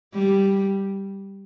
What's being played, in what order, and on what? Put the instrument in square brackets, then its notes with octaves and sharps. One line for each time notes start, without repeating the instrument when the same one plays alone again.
[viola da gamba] G3